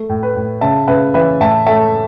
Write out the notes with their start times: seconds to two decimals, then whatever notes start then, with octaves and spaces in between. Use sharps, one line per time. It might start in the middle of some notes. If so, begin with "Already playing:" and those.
Already playing: A3
0.09 A2
0.23 B4
0.36 A2
0.61 C#3 E5 A5
0.88 C#3 B4 E5
1.14 E3 B4 E5
1.40 A2 E5 A5
1.66 A3 E5 A5